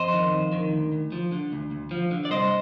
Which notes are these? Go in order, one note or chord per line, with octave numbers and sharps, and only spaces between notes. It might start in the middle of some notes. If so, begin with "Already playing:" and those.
Already playing: F2 C5 D#5
D#3
F2
D#3
D2
D2
F3
D3
D2
D2
F3
D3
D5
C2 C5 D#5